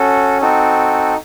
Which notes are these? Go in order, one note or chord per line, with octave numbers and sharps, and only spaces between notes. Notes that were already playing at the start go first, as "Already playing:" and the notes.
Already playing: C#4 F#4 A4
C4 D#4 F#4 A4